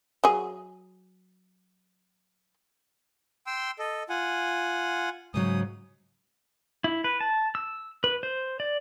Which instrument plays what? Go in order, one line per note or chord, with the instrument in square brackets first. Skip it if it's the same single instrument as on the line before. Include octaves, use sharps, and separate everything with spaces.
[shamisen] F#3 G#4
[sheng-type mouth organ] G5 C6 E6
A4 D#5
F4 F#5 G#5
[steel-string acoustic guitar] G#2 C#3 F#3 [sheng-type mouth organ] D#6
[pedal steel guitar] E4
B4
A5
E6
B4
C5
D5